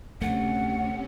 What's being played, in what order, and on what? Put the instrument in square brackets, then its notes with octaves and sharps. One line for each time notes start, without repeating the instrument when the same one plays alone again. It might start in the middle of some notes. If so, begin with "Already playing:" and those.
[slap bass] D2 A3 [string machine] C3 C#4 [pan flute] F#5